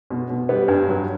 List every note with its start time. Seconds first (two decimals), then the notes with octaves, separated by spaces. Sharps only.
0.10 B2
0.30 B2
0.49 G3 B3
0.68 G2
0.88 F#3